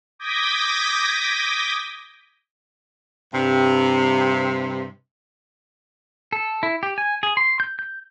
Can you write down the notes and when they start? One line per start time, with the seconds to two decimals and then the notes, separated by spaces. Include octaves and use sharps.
0.19 D6 D#6 G6 G#6 A#6 B6
3.33 G2 C3
6.32 A4
6.63 E4
6.83 G4
6.98 G#5
7.23 G#4
7.37 C6
7.60 G6
7.79 G6